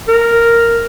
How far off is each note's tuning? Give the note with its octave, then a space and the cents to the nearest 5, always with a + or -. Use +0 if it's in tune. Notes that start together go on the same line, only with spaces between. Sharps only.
A#4 -5